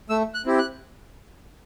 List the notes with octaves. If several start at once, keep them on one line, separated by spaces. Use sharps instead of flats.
A3 E6
F#6
C4 E4 G4
F#6